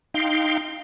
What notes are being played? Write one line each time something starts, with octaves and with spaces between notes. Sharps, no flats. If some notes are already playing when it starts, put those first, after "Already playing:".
D#4 F5 G5 C6